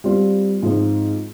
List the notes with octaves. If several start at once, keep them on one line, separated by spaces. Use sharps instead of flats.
G3 C4 F4
G#2 F3 C4